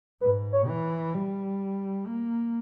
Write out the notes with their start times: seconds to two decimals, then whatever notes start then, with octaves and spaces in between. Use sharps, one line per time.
0.21 G#2 B4
0.53 C#5
0.67 E3
1.14 G3
2.06 A#3